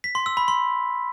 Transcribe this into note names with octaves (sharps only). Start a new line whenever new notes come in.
B6
C6
E6
B5
C6